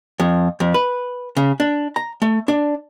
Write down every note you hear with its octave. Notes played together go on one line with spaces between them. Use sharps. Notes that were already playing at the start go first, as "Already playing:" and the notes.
F2
F2
B4
C#3
D4
A#5
A3
D4